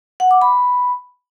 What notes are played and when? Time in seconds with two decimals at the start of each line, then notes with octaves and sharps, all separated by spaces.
0.20 F#5
0.31 D6
0.42 B5